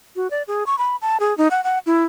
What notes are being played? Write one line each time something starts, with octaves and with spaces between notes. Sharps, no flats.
F#4
D5
G#4
C#6
B5
A5
G#4
D#4
F#5
F#5
E4